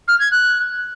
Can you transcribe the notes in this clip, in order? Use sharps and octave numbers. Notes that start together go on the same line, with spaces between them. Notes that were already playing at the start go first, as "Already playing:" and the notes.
F6
G#6
F#6